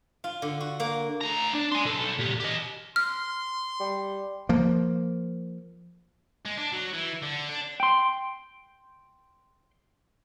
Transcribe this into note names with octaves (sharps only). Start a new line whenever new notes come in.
F4
D3
F#4
A#3
A2 A#5
D4
G#5 C6
B1 A4
A#2 G4
G4 D#5
C6 F6
G3
F3 A#3
G#3
D4
F#3
E3
D3
D4
G5 C6